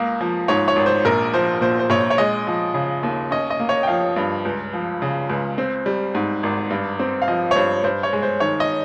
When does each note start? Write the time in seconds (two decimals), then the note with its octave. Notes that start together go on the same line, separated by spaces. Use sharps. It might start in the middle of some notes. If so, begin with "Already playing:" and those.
Already playing: C#2 A#3 D#5
0.21 F3
0.48 G#2 C#5
0.68 C#5
0.76 G#1
0.86 C5
1.05 A#1 A#4
1.34 F3 C5
1.61 A#2 C5
1.79 C5
1.90 A#1 C#5
2.10 C#5
2.18 G#3 D#5
2.47 F3
2.74 C#3
3.03 D#2
3.31 C#4 D#5
3.50 D#5
3.60 A#3
3.69 C#5
3.83 G5
3.87 F3 F5
4.16 G2
4.45 C#2
4.73 F3
5.02 C#3
5.30 C#2
5.58 C4
5.86 G3
6.15 G#2
6.43 G#1
6.70 G2
6.99 C4
7.22 F5
7.28 F3 D#5
7.51 C#5
7.55 G2 C5
7.84 G2 C5
8.03 C#5
8.13 G#3
8.23 C5
8.40 D#3 C#5
8.60 D#5